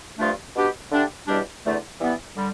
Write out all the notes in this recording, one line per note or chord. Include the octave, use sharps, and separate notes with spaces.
G2 F3 A3 D4 F4
B2 B3 D4 G4
D3 A3 D4 G4
E2 B2 G3 D4 G4
E2 D3 A3
E3 G3 B3
D3 G3